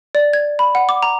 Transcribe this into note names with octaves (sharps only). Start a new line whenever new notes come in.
D5
G#6
B5
F#5
D6
A#5